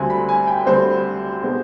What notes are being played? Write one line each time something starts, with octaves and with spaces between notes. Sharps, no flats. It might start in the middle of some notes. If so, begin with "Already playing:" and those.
Already playing: D2 D3 G3 C4 G#5
B5
G#5
G5
D2 D3 G3 C4 C5
B2 G#3 C4